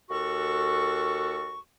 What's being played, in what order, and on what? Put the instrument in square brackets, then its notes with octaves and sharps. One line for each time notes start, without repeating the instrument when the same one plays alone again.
[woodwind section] D#2 F#4 A4 C#6